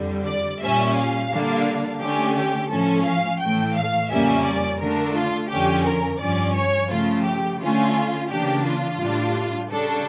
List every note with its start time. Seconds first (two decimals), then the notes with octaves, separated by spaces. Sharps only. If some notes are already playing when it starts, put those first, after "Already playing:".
Already playing: F2 D3 G3
0.26 D5
0.61 A#2 G3 C#4 E5
0.96 F5
1.31 D3 G3 A#3 D4
2.00 D3 A3 C#4 G4
2.36 G4
2.70 A2 F3 C#4 A4
3.05 F5
3.40 A2 E3 A3 G5
3.76 F5
4.10 F2 C#3 G3 A#3 C#4 E5
4.46 D5
4.80 D3 A3 D4 A#4
5.15 F4
5.50 F2 D3 F3 C#4 G4
5.86 A#4
6.20 G2 F3 C#4 D5
6.55 C#5
6.91 C#3 F3 A3 F4
7.25 G4
7.60 D3 A3 C#4 F4
8.30 C#3 E3 A#3 D4 G4
8.65 F4
8.99 A2 G3 D4
9.70 C#3 G3 D4 A4